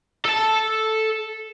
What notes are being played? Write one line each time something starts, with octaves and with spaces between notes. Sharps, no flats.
A4 A5